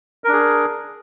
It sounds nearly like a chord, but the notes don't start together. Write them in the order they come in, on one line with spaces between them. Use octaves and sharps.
A#4 D4 G#4